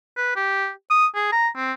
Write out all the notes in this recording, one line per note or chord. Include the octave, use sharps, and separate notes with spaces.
B4
G4
D#6
G#4
A#5
C4